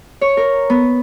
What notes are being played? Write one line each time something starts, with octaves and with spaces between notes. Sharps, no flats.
C#5
A#4
B3